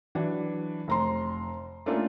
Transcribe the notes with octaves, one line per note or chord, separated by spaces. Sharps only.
E3 F#3 D4
F1 A#5 C6
A3 A#3 C#4 D4 F4 A4